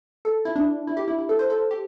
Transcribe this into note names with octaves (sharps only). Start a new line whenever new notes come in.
A4
E4
D4
E4
G4
E4
E4
A4
C5
A4
G4